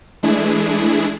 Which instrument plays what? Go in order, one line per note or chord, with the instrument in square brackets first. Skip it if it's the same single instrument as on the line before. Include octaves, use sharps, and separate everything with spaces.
[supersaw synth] E3 G#3 A3 D4 E4 G#4